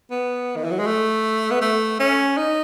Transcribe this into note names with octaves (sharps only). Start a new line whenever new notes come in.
B3
D#3
E3
F#3
G#3
A3
B3
A3
C#4
D#4